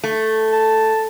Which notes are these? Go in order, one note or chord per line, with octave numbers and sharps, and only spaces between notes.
A3
A5